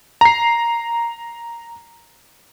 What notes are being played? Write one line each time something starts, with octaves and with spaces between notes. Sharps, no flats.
A#5 C7